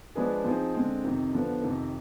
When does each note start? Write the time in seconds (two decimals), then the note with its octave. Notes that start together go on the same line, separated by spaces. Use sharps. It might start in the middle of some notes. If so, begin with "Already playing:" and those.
0.15 F3 G#3 D4 G#4 B4
0.44 F3 C4 D#4 G#4
0.75 D3 G#3 C4
1.04 F2 C3 D#3
1.33 D3 F3 B3
1.62 F2 C3 D#3